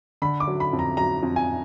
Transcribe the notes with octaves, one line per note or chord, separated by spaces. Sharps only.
D3 B5
D6
F#3
B5
F2
A#5
F#3 A#5
F2
G#5